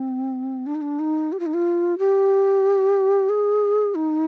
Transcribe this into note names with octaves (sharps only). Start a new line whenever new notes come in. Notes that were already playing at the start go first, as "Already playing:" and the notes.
Already playing: C4
D4
D#4
D4
D#4
G4
F4
D#4
F4
G4
G#4
D#4